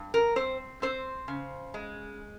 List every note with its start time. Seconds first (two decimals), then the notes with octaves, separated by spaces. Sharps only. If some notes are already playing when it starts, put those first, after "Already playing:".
Already playing: G2
0.14 A#4
0.36 C4 C5
0.82 C4 C5
1.28 C#3
1.74 G#3